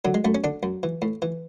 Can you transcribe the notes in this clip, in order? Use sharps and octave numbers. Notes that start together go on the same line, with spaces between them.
D3 F#3
G#3
F#2 A3
C#4
D3 D4
F#2
E3
A2
E3